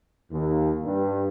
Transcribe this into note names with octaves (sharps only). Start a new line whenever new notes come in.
D#2
G2